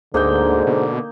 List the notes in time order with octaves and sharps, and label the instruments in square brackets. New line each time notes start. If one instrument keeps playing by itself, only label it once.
[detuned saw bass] D2 [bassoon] G#2 [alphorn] D3 [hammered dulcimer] A#3 D#4 G5
[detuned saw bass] B2